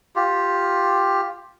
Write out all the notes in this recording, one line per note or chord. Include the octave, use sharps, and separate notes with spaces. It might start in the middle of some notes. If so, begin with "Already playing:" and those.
F4 G4